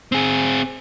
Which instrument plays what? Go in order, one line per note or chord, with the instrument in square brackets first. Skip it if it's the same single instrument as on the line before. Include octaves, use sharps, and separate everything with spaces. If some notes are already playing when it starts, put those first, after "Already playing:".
[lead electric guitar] C4 G#4